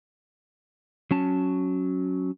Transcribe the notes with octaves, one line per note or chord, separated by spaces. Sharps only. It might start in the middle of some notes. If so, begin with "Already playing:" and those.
F#3 C#4 A5